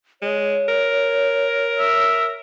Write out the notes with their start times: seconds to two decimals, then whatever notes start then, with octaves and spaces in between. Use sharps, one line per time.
0.22 G#3 C#5
0.68 A#4
1.78 E5